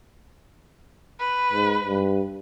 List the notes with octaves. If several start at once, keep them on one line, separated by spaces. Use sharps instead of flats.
B4
G#2
G2